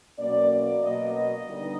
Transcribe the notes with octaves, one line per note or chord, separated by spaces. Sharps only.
B2 F#3 A#3 C#4 D5
D5
B2 F#3 A#3 D#5
D3 G3 B3 D#4